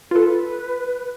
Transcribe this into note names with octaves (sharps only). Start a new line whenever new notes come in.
F4 A4 B4